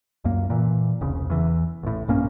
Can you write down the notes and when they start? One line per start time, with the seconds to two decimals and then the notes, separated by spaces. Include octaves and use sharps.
0.24 C#2 F#2 A#3
0.50 A#2 E3
1.01 E1 C2 C#3
1.30 E2 E3
1.83 A1 A2
2.08 A#1 G2 A#3 C#4